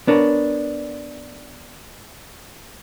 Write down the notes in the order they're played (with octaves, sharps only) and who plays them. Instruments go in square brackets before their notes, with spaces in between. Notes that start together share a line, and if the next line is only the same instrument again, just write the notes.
[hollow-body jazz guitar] B3 D4 A#4 C#5